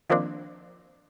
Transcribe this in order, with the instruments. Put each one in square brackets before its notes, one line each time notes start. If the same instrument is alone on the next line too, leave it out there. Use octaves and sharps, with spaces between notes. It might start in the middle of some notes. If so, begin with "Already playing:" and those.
[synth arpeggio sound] D#3 F3 A#3 C4 D4